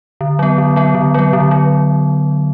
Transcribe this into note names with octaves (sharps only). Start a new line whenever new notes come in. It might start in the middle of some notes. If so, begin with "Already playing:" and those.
D3
F#3 B3
D3
F#3 B3
D3
F#3 B3
D3
F#3